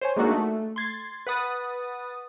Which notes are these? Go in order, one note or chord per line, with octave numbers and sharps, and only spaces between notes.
C5 C#5 G#5
G#3 A#3 D4 D#4 F#4 A4
A3
C6 G#6 A6
B4 F#5 D#6 A6